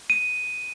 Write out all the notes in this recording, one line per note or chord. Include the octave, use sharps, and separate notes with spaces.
D#7